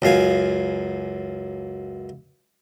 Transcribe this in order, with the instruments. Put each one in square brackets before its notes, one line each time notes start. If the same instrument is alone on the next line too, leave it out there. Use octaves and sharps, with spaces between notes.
[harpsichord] C#2 F#2 F5 G#5